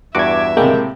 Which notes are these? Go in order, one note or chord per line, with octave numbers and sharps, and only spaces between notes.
E2 G2 F#4 E5 D6 G#6
A2 C3 G#3 A#3 G5